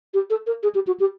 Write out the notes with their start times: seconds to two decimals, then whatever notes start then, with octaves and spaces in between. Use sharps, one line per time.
0.14 G4
0.30 A4
0.47 A#4
0.63 G#4
0.75 G4
0.87 F#4
1.00 G4